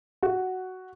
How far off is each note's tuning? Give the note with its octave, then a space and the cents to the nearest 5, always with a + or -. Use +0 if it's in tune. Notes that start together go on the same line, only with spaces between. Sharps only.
F#4 +5